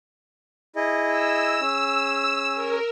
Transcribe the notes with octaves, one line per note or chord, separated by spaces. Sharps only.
E4 G#4 D#5
E6
C#4 G#4
A#4